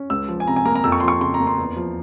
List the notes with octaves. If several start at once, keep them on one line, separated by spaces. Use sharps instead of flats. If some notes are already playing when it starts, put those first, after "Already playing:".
Already playing: C#4
C#2 E6
F3
G#5
C3 A#5
G#5
A#3 A#5
A#5
F2 E6
C#6
F3 C6
C#6
C#3 C6
A#5
A#3
C6
E2
F3